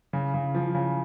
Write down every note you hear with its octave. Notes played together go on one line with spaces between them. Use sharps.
C#3
C#3
F3
C#3